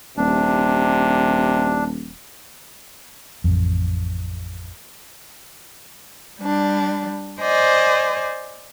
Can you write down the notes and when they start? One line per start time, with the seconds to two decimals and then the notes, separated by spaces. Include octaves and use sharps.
0.17 D#1 C3 D4
3.44 A1 F2
6.39 G3 D4
7.40 C5 D5 D#5 G#5